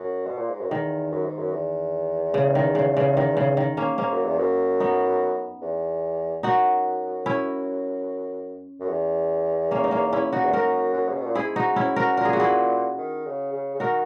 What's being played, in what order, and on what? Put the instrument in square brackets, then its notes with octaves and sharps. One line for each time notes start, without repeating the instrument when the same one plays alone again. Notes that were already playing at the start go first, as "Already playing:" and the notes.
Already playing: [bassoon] F#2
B2
A#2
G#2
F#2
[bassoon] E2 [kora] D#3
[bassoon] F#2
G#2
F#2
E2
[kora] C#3
D#3
C#3
C#3
D#3
C#3
D#3
A#3 C#4
[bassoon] G#2 [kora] A#3 C#4
[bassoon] F#2
E2
F#2
[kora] B3 D#4
[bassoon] E2
[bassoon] F#2 [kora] D#4 F#4
[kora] C#4 E4
[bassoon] F#2
E2
[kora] A#3 C#4
D#4
A#3 C#4
C#4 E4
D#4 F#4
[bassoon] E2
[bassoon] F#2 [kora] F#4 A#4
[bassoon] F#2
C#3
B2
A#2
[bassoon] G#2 [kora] E4 G#4
[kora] D#4 F#4
C#4 E4
F#4 A#4
[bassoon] A#2 [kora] A#4
[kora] G#4
F#4
E4 G#4
[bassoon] D#3
C#3
C#3
C#3
[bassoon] D#3 [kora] F#4 A#4